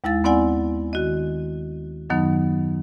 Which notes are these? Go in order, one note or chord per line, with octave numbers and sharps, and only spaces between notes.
D#2 G#3 E4 F5 A6
B3 C4 E4 D5 F#5 G#5
D#3 F#4 D#5
F#2 D#3 F#3 B3 D#4